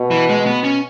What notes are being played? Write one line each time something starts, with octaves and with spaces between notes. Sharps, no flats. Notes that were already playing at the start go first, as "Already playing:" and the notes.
Already playing: B2
E3
G#3
B3
C#4